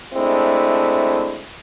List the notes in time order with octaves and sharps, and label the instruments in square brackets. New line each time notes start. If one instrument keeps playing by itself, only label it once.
[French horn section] G#3 A3 C4 D4 E4